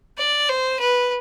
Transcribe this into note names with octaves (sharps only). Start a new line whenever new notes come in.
D5
C5
B4